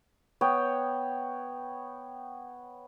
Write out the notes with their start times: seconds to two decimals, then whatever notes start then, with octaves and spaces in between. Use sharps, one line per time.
0.41 B3 C#5 G5